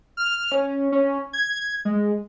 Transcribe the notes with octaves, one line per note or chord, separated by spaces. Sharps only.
F6
C#4
C#4
G#6
G#3